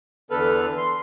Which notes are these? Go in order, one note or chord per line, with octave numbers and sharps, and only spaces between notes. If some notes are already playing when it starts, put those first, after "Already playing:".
E2 D3 B3 A4 B4 F6
C6